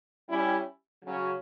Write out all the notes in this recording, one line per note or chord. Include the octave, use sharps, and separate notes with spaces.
G3 C#4 E4 G4
C#3 F#3 C#4 F#4